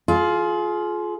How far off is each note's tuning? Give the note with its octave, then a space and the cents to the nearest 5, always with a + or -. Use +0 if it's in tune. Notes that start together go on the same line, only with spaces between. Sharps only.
F4 +0 G#4 +35